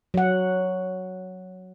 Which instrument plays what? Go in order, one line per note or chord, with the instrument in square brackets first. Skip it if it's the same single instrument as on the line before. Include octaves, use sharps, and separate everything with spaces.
[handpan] F#3 F#5